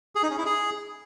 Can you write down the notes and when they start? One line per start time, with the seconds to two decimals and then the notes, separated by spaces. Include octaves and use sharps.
0.15 G#4
0.23 D#4
0.30 C#4
0.38 E4
0.46 G#4